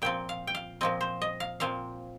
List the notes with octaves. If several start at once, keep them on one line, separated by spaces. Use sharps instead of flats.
A#2 F3 C4 G5
F5
G5
F5
A#2 F3 C4 D#5
C5
D#5
F5
A#2 F3 C4 F5